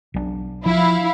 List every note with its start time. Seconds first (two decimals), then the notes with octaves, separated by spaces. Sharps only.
0.14 B1 F3 D4
0.66 F3 E4 F5